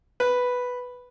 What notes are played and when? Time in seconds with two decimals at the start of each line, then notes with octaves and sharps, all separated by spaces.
0.20 B4